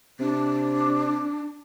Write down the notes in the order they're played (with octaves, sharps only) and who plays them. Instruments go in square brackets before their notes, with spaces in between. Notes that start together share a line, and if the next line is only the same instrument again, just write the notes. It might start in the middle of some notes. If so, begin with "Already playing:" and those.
[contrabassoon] C3 [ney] D4